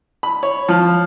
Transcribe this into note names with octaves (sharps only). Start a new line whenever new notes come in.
B5
C#5
F3